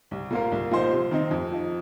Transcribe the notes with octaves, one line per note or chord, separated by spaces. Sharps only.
C2
A#2 A#3 F4 A#4
C2
A#2 F3 D#4 C5
C3
D#3 C4 D#4
F2
F3 D#4